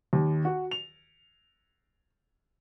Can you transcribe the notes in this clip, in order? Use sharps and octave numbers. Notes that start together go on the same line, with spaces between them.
D#2
F#4
F7